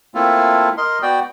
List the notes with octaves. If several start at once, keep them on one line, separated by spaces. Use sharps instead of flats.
A3 A#3 C4 E4 F4 A4
A#4 D#5 C6
B3 F#4 D5 G5